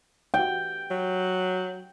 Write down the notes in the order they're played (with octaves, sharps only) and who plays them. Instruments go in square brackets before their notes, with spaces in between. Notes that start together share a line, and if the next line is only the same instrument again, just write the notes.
[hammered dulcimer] G5
[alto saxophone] F#3